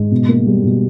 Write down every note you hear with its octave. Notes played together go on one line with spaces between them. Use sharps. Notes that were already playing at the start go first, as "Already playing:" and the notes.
Already playing: G#2
B2
A#3
G3
B2